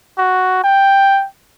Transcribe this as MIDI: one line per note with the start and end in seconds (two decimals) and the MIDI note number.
0.18 0.63 66
0.64 1.26 79